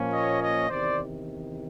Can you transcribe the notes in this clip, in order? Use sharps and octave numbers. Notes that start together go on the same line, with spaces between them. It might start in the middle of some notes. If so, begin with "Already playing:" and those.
Already playing: A#2 F3 A#3 C#4
C#5 D#5
C#5 D#5
E2 C3 D#3 C5 D5